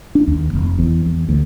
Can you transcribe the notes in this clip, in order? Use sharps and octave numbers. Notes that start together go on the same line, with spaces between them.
D4
D#2
F1
E2
E2
D2